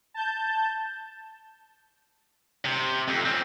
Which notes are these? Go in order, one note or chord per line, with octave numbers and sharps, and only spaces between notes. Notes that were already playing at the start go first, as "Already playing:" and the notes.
A5 G6
C3
F2
C4 C#4